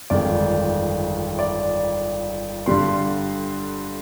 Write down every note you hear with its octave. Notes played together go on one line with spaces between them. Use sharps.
G1 F2 D#3 G#3 D5
D5
G2 D3 G3 C6